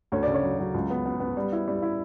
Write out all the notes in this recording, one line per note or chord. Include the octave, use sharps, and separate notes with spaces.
D2 C#5
C#3 D5
C#5
F#3
F#3
C#2
B3
B3
B3
G3
E4
G3
E4